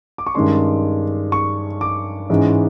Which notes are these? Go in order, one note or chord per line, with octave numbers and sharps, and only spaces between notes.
D6
C#6
G2 D#3 G#3 C#4 C6
C#6
D6
G#2 E3 G#3 C#4